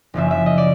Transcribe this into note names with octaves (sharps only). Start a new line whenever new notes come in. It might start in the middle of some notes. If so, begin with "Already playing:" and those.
F#1 F#2 C#3 F3 E5
E5
D#5
D5